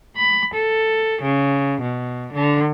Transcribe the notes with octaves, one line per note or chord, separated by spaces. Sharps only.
B5
A4
C#3
B2
D3